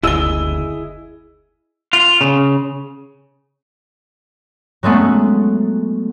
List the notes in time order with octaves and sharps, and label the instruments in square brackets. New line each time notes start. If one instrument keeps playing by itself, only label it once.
[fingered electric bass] F#1 D2 [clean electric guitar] E4 G#4 D#5 [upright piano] E6 G7
[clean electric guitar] F4
C#3
[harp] F#3 G#3 A3 B3